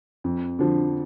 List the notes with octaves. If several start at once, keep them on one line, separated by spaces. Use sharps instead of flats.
F2
D3 F3